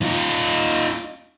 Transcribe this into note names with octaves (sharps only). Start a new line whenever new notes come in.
D#4 F4